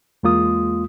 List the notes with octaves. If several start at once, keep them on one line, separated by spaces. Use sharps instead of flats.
E2 G#3 A#3 F4 D#6